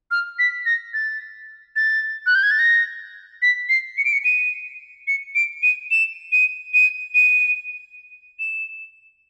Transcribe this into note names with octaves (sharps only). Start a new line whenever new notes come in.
F6
B6
A#6
A6
A6
F#6
G6
G#6
A6
A#6
B6
C7
C#7
D7
C#7
D#7
C#7
D7
D#7
E7
D#7
D#7
D#7
E7